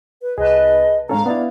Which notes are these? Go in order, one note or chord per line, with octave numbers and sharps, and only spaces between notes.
B4
C2 G#4 B4 D#5 A5
G#2 C#4 D4 A4 F5 A#5
B3 E4 D5